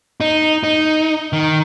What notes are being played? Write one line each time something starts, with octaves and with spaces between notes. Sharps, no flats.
D#4
D#4
D#3